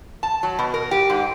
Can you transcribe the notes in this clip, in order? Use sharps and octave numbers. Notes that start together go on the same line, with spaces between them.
A5
F#3
B2
A#4
G4
G#2